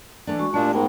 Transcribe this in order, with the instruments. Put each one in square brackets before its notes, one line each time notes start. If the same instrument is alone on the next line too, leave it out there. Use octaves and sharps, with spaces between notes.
[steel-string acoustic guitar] E3 A3 D4
[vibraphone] G#3 F#4 C#6
[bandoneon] A#2 D4 [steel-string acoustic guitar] G#3 E5 [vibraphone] A3 G4
[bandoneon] G#2 [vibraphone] B3 G5 [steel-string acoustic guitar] A#4